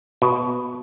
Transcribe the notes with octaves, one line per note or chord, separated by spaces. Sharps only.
B2